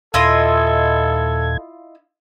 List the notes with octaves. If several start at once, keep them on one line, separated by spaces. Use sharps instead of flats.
D#2 A#2 E4 F4 A4 D#5 G#6